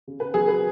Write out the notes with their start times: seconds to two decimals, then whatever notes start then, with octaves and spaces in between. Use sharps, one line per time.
0.07 C#3
0.20 B4
0.34 F#3 G#4
0.48 B4